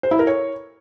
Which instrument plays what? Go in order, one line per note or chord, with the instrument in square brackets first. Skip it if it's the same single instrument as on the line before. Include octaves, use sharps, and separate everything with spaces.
[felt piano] C5
E4
A#4
C#5